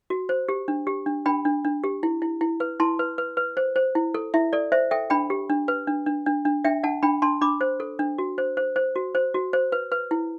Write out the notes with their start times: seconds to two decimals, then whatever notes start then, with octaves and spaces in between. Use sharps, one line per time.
0.10 F#4
0.29 C5
0.49 G4
0.68 D4
0.87 G4
1.06 D4
1.26 D4 G5 B5
1.45 D4
1.65 D4
1.84 G4
2.03 E4
2.22 E4
2.41 E4
2.60 B4
2.80 E4 A5 C6
2.99 B4
3.18 B4
3.37 B4
3.57 C5
3.76 C5
3.95 E4
4.14 A4
4.34 E4 E5
4.53 A4 D5
4.72 C5 E5
4.91 A4 E5 G5
5.10 D4 G5 B5
5.30 G4
5.50 D4
5.68 B4
5.87 D4
6.06 D4
6.26 D4
6.45 D4
6.64 D4 E5 G5
6.83 D4 F#5 A5
7.03 D4 G5 B5
7.22 D4 A5 C6
7.41 D4 B5 D6
7.61 C5
7.80 A4
7.99 D4
8.18 F#4
8.38 C5
8.57 C5
8.76 C5
8.96 F#4
9.15 C5
9.34 F#4
9.53 C5
9.72 B4
9.92 B4
10.11 E4